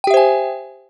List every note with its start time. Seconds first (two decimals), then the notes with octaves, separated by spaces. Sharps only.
0.04 G5
0.07 G4
0.11 E5
0.14 C5
0.17 G#5